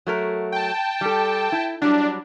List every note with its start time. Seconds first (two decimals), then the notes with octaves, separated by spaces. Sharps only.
0.07 F#3 A3 A#4
0.52 G5 A5
1.01 G3 A4
1.52 E4
1.82 F#3 G3 D4